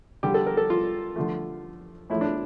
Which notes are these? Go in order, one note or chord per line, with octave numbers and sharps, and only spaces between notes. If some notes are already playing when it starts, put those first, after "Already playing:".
D3 G3 G4
A4
A#4
A4
F4
D3 F3 A3
A2 F3 A3 E4
D4